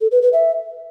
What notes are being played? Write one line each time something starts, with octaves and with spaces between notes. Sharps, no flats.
A4
B4
B4
E5